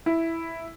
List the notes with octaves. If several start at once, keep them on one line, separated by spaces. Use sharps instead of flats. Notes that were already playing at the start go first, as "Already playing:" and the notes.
E4